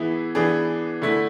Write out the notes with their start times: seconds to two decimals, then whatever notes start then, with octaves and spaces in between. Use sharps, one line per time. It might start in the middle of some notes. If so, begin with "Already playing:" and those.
Already playing: E3 B3 E4 G#4
0.35 E3 B3 D4 G#4
1.02 D3 A3 E4